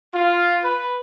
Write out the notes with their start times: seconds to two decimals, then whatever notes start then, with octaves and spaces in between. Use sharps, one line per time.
0.13 F4
0.63 B4